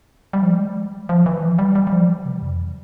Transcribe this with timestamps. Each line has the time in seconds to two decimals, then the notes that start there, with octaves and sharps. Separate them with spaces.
0.33 G3
0.43 F3
0.54 G#3
1.09 F3
1.26 E3
1.42 F3
1.59 G3
1.75 G3
1.87 G3
1.92 F3
2.09 E3
2.25 C3
2.42 F2